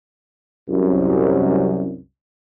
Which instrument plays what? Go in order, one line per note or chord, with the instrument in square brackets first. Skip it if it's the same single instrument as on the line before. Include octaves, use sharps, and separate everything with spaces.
[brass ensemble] C2 F#2